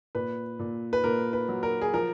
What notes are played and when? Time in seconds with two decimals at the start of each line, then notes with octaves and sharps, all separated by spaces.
0.15 A#2 B4
0.59 A#2
0.93 B4
1.04 A#2 A#4
1.33 B4
1.49 F#3
1.63 A#4
1.82 G#4
1.93 F3 A#4